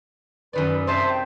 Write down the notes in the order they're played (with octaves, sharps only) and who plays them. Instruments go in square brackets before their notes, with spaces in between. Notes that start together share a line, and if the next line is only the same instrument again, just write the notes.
[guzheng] F#2 D#3 D5 [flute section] B4
[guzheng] C3 D#5 A5 [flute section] C5 E5
[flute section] G5